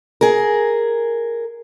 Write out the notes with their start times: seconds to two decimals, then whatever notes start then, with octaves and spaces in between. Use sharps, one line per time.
0.21 G#4 A#4